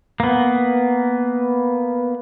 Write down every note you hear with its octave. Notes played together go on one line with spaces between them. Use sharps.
A#3 B3